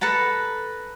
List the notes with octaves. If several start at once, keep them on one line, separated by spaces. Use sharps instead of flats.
A4 B4 A5 A#5